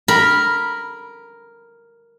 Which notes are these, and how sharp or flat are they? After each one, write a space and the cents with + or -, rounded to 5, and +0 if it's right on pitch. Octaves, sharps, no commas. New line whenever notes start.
A#4 +0 B5 -15